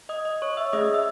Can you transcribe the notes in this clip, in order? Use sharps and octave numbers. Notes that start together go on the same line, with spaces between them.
D#5 D#6
D#5 D#6
C#5 C#6
E5 E6
A3 C#4 G#4 D#5 D#6
E5 E6